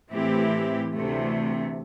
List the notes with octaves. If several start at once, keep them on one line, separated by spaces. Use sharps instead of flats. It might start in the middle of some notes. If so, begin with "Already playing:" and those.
A2 E3 C4 E4 G4
D2 C3 E3 A3